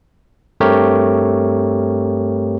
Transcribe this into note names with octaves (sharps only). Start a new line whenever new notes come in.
G2 A3 C4 G4 A#4 C#5